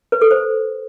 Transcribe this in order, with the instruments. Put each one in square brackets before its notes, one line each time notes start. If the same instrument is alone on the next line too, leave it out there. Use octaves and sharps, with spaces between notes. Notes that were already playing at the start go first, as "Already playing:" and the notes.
[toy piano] B4
A4
C5